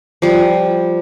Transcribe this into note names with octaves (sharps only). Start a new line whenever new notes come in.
F3 G3